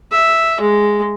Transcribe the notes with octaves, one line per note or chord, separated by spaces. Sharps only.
E5
G#3